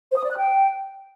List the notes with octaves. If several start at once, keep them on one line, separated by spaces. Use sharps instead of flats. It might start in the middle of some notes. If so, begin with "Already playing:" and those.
C5
D#6
D5
F#6
G5